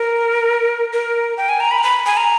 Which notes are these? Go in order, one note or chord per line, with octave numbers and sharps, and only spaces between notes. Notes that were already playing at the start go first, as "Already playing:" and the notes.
Already playing: A#4
A#4
G5
G#5
A#5
B5
A#5
B5
G#5
A#5